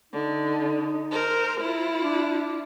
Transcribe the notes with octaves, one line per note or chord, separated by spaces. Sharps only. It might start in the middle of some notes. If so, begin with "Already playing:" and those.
D3 D#4
A#4 C5
E4 F4
D4